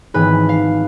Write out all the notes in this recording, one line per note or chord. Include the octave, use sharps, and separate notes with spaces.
G#1 G#2 E3 B3 B4
F5